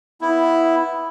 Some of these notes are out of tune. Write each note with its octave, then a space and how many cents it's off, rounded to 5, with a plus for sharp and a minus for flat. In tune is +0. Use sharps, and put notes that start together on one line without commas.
B3 +0 E4 +0